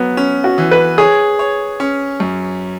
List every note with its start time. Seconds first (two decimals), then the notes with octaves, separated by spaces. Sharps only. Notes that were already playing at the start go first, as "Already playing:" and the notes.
Already playing: F#3 B3
0.17 C#4
0.44 F#4
0.58 E3
0.71 B4
0.98 G#4 C#5
1.39 C#5
1.80 C#4
2.20 F#2